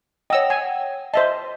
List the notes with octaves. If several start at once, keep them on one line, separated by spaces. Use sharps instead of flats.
C#5 D#5 F#5 G5 E6
G#5
C5 D#5 E5 A5